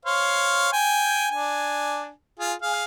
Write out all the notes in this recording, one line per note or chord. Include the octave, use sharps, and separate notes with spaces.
C5 C#5 F5
G5 G#5
D4 G#5
F4 G#4
G#4 F5